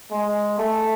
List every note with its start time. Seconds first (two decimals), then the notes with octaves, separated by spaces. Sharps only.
0.11 G#3
0.58 A3